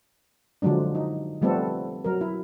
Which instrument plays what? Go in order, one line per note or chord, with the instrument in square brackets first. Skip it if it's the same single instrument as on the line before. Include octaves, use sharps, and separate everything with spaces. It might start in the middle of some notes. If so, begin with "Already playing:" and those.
[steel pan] D3 F3 F#3 G#3 D4
D#4
F3 G3 A3 B3 C4 A4
F#3 A#4
E4